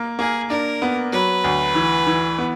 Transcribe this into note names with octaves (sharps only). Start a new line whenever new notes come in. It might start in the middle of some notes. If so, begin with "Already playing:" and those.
Already playing: A#3
A#3 G#4
D4 A#4
B3
F#3 B4
D2
E3
E3
B3